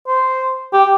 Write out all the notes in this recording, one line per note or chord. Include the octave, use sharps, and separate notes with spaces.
C5
G4